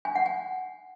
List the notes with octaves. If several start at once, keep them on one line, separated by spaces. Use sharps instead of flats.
G#5
F#5
G#5